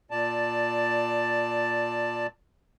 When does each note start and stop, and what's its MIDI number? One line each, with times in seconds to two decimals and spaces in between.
0.11 2.27 46
0.11 2.27 74
0.11 2.27 81